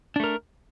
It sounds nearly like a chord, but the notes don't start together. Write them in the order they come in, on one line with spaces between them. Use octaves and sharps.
D4 A3 A#4